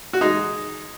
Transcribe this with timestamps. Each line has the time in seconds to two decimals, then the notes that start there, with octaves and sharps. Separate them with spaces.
0.13 F#4
0.21 G#3 D#4